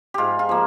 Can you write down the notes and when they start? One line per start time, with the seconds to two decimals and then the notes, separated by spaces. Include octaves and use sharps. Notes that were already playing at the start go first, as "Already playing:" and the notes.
0.14 G#2 F4 G4
0.39 F4
0.49 F3 A#3